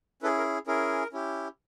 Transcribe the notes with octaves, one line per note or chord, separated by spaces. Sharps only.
C#4 E4 G#4 A4 B4
A#4
C#4 E4 G#4 A#4
C#4 E4 G4